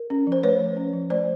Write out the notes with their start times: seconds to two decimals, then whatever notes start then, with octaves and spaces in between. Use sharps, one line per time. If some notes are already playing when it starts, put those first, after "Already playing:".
Already playing: A#4
0.10 C#4
0.27 F3
0.32 C5
0.43 A3 B4 C#5
0.60 F3
0.77 C#4
0.93 F3
1.10 A3 C5 D5